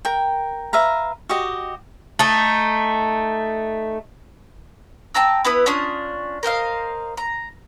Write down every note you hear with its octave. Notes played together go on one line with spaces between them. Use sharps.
A#4 G5
B4 E5 F5 A#5
F#4 G4 D#5
A3 D#4
G5 A5 A#5 E6
B3 E4 B4 D#6
C#4 D4 F4 D#6
A#4 C5 D#5 F5
A#5